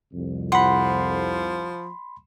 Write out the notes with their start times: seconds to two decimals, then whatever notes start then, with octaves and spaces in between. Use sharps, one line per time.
0.13 C2 F2
0.52 F3 F#5 B5 C6